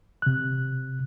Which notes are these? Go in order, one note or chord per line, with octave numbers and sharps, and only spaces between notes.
C3 F#6